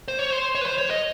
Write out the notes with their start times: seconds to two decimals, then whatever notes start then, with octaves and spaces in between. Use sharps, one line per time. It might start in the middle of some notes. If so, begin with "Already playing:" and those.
0.08 C5
0.19 C#5
0.30 C5
0.55 C#5
0.61 B4
0.66 C5
0.78 C#5
0.90 D#5